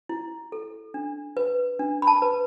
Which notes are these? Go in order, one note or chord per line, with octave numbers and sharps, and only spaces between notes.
E4
A4
D4
B4
D4
B5
A5
B4